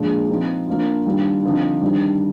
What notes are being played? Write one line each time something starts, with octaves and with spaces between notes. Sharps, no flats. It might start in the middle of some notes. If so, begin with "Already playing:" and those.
Already playing: A#2 F3 G#3 D4
F3 C4 D#4
F3 A#3 D4 F4
D#3 G3 D4 F4
D3 F3 C4 D#4
D#3 G3 D4